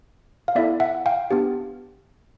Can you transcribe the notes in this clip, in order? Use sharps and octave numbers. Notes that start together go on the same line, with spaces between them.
F5
B3 E4 A4 D5 E5
E5 F#5
F5 G5
B3 D4 G4